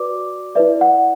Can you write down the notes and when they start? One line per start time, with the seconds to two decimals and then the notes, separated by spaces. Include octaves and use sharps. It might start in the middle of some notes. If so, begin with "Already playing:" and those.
Already playing: F#4 B4 D5 D6
0.55 E4 B4 D5 E5
0.81 F#5